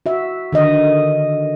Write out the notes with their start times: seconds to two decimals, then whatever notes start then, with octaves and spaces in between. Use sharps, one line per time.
0.06 F#4 E5
0.52 D3 D#3 D#5